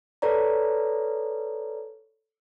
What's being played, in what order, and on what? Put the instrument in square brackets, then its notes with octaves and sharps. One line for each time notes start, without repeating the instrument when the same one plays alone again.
[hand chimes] A4 B4 C#5 D5 A#5